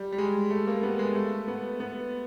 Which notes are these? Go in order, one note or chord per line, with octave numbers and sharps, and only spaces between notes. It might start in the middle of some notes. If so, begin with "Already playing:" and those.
Already playing: G3
G3
G#3
A3
A#3
B3
G#3
A3
B3
B3